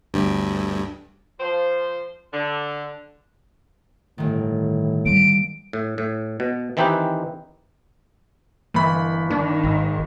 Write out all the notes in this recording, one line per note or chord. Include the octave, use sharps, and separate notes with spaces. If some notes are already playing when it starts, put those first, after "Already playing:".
G1 D2 G2
F3 C5
D3
G1 A2 D#3
G3 A#3 D7
A2
A2
B2
D#3 E3 C4 D#4 G4 B4
G1 E3 A#3 B5
D#3 A#3 D4
G#1